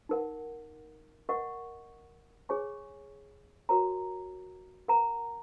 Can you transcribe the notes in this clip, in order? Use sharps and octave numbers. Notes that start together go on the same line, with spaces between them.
D#4 A#4 F#5
A#4 D#5 F#5 C#6
G#4 C#5 G#5 C#6
F#4 A#4 C#5 A#5
A#4 F#5 A#5